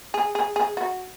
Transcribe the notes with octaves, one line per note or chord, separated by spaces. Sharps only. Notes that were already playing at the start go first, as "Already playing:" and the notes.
G#4
G#4
G#4
F#4